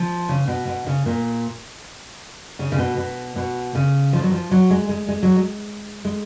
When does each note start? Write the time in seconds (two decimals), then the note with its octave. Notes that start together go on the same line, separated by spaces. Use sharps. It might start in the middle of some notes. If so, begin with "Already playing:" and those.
Already playing: F3
0.29 C#3
0.48 B2
0.67 B2
0.87 C#3
1.06 A#2
2.59 C#3
2.72 C#3
2.79 B2
2.97 B2
3.36 B2
3.75 C#3
4.13 F3
4.22 F#3
4.32 F3
4.51 F#3
4.70 G#3
4.89 G#3
5.08 G#3
5.23 F#3
5.36 G#3
6.05 G#3